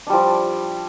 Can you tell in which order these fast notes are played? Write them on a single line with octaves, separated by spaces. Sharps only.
D4 G3 F3